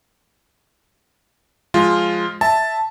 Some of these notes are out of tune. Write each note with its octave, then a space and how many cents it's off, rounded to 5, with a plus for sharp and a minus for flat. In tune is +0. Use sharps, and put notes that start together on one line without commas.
F3 +0 G#3 +0 F4 +0
E5 -10 A5 +0